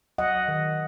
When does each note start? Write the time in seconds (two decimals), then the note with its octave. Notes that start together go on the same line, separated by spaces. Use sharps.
0.18 F#3 D#5 F#5
0.48 D#3